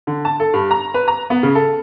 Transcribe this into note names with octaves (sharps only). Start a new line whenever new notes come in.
D3
A5
A4
G2
A#5
B4
A#5
B3
C#3
A4